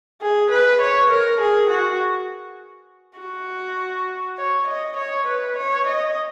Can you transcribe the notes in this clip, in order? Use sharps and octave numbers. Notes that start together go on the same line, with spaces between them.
G#4
B4
C#5
A#4
G#4
F#4
F#4
C#5
D#5
C#5
B4
C#5
D#5